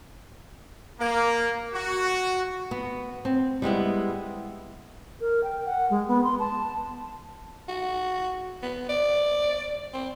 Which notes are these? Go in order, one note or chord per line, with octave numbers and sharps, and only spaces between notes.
A#3
F#4
B3
C4
G3 G#3 B3 E4
A#4
G5
F#5
G#3
B3
C6
A5
F#4
B3
D5
C4